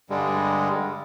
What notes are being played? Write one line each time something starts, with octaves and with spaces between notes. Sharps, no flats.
G2 D3 G3 G#3